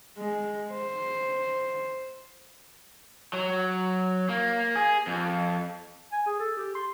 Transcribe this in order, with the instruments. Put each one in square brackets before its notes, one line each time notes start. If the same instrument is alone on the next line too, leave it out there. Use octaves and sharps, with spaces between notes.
[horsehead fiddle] G#3
C5
[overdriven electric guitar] F#3
A#3
G#4
F2
[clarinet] G#5
G#4
A4
G4
C6